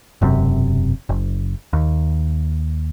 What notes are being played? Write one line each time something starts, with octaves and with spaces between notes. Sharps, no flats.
E1 F#2 C3
F#1
D#2